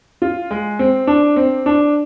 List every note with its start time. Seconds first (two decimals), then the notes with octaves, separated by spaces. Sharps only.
0.22 F4
0.51 G#3
0.79 C4
1.07 D4
1.36 C4
1.66 D4